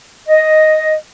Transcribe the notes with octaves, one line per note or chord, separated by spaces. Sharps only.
D#5